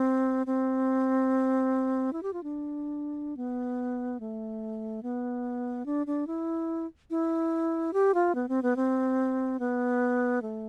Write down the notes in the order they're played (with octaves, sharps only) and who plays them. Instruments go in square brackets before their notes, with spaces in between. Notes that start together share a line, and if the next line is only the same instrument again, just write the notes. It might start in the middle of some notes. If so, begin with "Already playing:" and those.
Already playing: [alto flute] C4
C4
E4
G4
F4
D4
B3
A3
B3
D4
D4
E4
E4
G4
F4
B3
C4
B3
C4
B3
A3